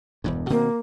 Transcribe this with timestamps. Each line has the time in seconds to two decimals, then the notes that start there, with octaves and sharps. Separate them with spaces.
0.24 E1 E2 G2
0.50 B2 D#3 A#3 C4